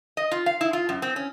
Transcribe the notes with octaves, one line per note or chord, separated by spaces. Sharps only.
D#5
F4
F5
E4
F4
F#2
C4
C#4